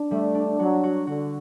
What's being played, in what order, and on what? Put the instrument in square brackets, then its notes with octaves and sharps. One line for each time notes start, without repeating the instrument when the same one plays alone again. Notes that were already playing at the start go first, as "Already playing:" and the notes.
Already playing: [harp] D4
[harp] G3 [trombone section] A3
[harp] D4
[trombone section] F#3 [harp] F#4
[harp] F#4
[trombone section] D3 [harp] F#4